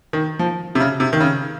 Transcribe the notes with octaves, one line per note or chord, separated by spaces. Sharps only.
D#3
F3
C3
C#3
C3
D#3
C#3